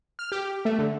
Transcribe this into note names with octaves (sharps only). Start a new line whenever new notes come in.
F6
G4
A3
D3